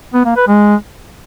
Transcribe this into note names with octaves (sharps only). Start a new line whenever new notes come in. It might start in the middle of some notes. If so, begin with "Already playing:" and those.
B3
A#3
B4
G#3